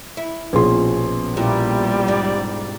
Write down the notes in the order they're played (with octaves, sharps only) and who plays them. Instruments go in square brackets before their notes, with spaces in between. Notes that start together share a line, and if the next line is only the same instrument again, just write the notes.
[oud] E4
[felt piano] A#1 G#4 C6 [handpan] B2 C#4
[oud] A#2 [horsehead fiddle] G3 [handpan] E4 F4 G4
[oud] G#2 [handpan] D5